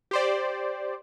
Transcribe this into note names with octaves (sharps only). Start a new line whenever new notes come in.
G4 C5 D5